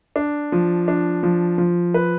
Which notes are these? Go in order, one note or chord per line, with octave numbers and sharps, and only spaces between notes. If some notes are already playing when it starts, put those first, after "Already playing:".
D4
F3
D4
F3
F3
B4